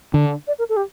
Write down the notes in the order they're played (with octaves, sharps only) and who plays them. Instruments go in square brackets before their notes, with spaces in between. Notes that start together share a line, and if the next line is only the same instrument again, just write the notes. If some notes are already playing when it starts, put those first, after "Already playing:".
[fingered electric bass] D3
[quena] D5
A#4
A4
G4